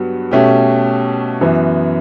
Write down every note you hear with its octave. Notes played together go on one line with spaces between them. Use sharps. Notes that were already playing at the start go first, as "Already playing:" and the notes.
Already playing: G2 F#3 B3 F#4
B2 A3 C#4 G4
F#2 E3 B3